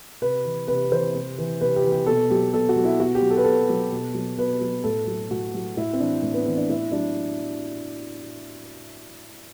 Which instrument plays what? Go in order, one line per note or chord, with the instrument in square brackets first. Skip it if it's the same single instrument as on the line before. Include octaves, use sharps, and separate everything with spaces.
[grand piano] C3 B4
E3
C3 B4
E3 C5
C3
E3
C3 B4
G4
E3
G4
B2 A4
F#3 G4
B2 A4
F#4
F#3
E4
B2 F#4
G4
F#3
A4
B4
B2 A4
F#3
B2
F#3
B2 B4
F#3
A2 A4
F#3
A2 F#4
F#3
A2 E4
C4
E3 D4
A2 C4
B3
E3 C4
D4
A2 E4
F#3 D4